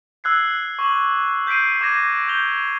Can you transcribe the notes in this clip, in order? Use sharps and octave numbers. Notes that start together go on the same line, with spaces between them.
E6 F#6 G#6 C7
C#6 D6 F#7
G6 B6 C7 D7 D#7
D6 G#6 A#6 D#7
G6 F7 G7